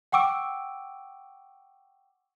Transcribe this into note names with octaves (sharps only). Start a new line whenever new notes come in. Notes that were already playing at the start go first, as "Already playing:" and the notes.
F#5 G5 C#6 D6 E6 D7